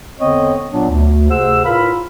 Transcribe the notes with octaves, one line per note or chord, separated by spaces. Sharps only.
E2 D3 B3 C4 C#5 D#5
A#2 F#3 B3 D4
D2
D2 C3 G#4 C5 F#5 E6
A2 F4 A#4 B4 F5 B5